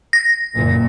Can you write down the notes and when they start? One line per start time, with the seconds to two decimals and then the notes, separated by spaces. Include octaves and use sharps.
0.13 A#6
0.56 F#1 A#2